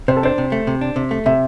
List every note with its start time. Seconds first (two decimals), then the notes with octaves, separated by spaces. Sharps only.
0.08 C3 C5
0.17 A4
0.23 D4 C5
0.38 C3
0.52 A3
0.67 C3
0.81 D4
0.96 C3
1.11 A3
1.26 C3 E5